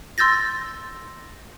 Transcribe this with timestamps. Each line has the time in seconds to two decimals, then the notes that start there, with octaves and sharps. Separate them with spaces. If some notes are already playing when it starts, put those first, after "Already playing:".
0.18 C6 E6 G6 A6 A#6